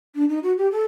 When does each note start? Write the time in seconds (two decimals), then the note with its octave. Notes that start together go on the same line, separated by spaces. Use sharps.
0.15 D4
0.29 D#4
0.43 F#4
0.57 G4
0.72 A4